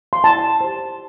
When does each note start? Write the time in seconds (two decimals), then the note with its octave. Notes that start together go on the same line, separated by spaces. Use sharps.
0.13 C6
0.24 E4 A5
0.61 G4 C5